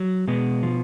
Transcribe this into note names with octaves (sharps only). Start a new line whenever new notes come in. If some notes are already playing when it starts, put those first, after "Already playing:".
Already playing: F#3
B2 G#3 B3
F3